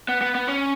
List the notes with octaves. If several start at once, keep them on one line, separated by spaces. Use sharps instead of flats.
B3
B3
B3
C#4